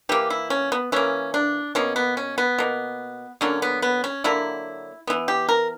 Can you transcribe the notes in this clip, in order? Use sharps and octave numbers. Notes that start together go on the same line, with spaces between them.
E3 A#3 G4
E4
C#4
B3
E3 A#3 C#4
D4
B2 A#3 C#4
B3
C#4
B3
B2 A#3
D3 F#3 A#3 C#4
B3
B3
C#4
D3 F#3 A#3 E4
E3 B3
G4
A#4